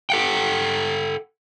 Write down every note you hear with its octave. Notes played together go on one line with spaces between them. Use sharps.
A4 F#5 G5